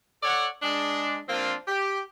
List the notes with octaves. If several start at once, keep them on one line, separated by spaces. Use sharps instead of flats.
A4 C#5 D5 F#5
G#3 D4
F3 A#3 C4 D4 F4
G4